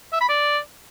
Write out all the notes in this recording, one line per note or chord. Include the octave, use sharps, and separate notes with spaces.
E5
B5
D5